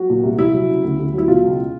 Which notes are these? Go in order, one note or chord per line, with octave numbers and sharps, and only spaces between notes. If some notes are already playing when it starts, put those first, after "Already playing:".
Already playing: F#3 F#4
A#2
C2
C2 E4
F#3
C#3
D2
D2
F#3 E4
B2 F4
C#2